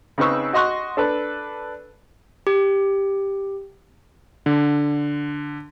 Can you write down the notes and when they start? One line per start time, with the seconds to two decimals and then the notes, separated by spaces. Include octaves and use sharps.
0.18 C#3 C4 D#4 B4 C#6 E6
0.53 F#4 D#5 C6 C#6 F#6
0.97 D4 A4 B4
2.47 G4
4.46 D3